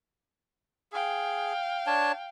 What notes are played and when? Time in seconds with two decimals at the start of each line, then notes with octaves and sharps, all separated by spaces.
0.92 G#4 F5 G5
1.87 D4 C#5 A5